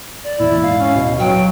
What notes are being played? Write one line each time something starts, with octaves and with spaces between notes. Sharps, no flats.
D5
E2 A#2 E4
G#2 F5
C#4
D1 B2
F#3 G5